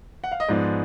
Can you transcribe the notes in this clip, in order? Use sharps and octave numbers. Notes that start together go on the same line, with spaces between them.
F#5
F5
D#5
G#2 F3 G#3 B3 D5